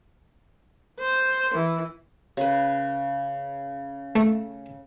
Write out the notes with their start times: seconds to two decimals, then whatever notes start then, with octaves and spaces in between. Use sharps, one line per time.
0.99 C5
1.53 E3
2.37 C#3 B4
4.16 A3